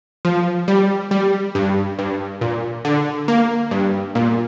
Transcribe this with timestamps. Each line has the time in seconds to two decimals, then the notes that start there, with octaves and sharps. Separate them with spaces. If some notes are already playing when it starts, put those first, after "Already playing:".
0.25 F3
0.68 G3
1.11 G3
1.55 G2
1.99 G2
2.41 A#2
2.85 D3
3.28 A#3
3.71 G2
4.15 A#2